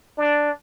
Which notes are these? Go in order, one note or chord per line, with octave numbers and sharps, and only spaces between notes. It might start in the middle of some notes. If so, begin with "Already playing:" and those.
D4